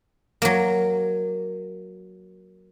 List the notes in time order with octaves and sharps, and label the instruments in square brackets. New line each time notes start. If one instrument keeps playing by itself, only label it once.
[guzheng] F#3 A#3